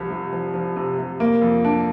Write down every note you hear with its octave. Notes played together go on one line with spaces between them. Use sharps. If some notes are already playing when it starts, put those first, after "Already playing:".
Already playing: C2 C3 F3
C3
F3
F3
C3
C3
A#3
F2
D4